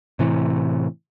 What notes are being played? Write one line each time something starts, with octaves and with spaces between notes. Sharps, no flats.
A2 C3 E3